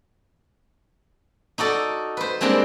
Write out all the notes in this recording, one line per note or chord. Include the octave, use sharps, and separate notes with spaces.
D#4 F#4 A4 D5
B4 C5
G3 G#3 A#3 C4 D4 C5